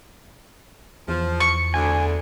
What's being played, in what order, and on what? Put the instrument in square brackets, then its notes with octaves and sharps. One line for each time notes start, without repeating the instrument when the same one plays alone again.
[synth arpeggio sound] E2 [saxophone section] F3
[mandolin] C#6
[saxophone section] D2 D3 [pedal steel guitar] G#5